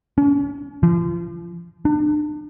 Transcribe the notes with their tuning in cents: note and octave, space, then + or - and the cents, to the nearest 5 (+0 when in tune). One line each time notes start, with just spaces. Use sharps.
C#4 +40
F3 -35
D4 +35